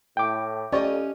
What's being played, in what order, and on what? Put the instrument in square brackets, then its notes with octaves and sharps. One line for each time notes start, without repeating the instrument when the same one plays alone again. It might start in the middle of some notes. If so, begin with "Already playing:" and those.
[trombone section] A2 [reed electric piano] G5 D6
[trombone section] F2 A3 [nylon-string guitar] C#4 G4 D#5 [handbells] C5 D5 C#6